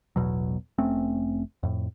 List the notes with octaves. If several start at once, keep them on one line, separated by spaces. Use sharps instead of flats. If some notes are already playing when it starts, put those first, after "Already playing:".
A1 E2 B2 F#3
F1 A3 C4 C#4
F2 A2